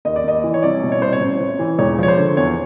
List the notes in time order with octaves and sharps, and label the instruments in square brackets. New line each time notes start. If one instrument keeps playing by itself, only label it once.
[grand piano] D#2 D#5
D5
D#2 D#5
E3
C#5
C2 D5
B2
C#5
C2 C5
C#5
A1
A1
E3
E1 C#5
F3 C#5
C5
D3
E2 C#5